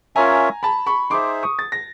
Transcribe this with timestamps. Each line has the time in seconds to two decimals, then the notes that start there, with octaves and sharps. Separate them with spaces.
0.16 C#4 F4 A#4 C#5 E5 G#5 A#5
0.63 A5 B5
0.86 B5 C#6
1.10 D#4 G#4 C5 E5 C6 D6
1.43 C#6 D#6
1.59 A6
1.72 A#6